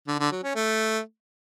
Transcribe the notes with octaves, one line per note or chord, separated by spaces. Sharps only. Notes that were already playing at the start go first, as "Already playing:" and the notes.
D3
D3
F#3
C#4
A3